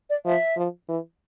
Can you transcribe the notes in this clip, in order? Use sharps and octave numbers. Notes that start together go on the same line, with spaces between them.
D5
F3 E5
F3
E3